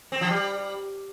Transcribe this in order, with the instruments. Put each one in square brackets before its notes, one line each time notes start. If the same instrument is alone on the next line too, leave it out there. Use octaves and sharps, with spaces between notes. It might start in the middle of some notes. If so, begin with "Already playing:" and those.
[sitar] C4
F3
G3